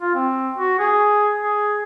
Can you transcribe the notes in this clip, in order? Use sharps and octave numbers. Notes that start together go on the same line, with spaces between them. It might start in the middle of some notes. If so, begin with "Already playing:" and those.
F4
C4
F#4
G#4
G#4